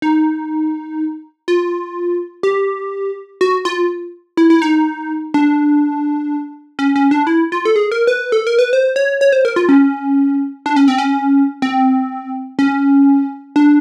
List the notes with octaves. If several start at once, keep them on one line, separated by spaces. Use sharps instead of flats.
D#4
F4
G4
F#4
F4
E4
E4
D#4
D4
C#4
C#4
D4
E4
F4
A4
G#4
A#4
B4
A4
A#4
B4
C5
C#5
C#5
C5
A#4
F4
C#4
D4
C#4
C4
C#4
C4
C#4
D4